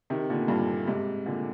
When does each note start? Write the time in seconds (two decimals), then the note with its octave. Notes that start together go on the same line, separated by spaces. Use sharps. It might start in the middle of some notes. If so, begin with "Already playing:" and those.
0.10 C3 D#3
0.30 A#2 D3
0.48 G2 A#2
0.87 G#2 C3
1.26 A#2 D3